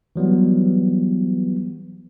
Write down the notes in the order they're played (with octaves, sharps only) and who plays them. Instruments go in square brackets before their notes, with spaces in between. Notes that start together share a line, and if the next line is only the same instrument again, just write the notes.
[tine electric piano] E3 F#3 G3 B3